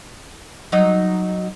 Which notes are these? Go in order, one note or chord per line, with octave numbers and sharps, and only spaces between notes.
F#3 D#4 D#5